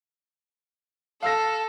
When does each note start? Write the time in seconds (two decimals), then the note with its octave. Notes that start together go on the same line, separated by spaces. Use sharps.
1.22 A4 F5 E6 A#6